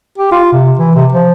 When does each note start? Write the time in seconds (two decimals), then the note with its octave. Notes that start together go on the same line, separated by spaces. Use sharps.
0.18 G4
0.32 F4
0.53 C3
0.79 E3
0.95 C3
1.13 F3